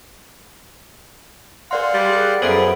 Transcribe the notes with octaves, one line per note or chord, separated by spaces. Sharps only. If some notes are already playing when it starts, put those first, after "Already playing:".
A#4 D5 F5 F#5 C6
G3
G#4 F#6
F#2 B3 G#4 A4 C5 E5 D7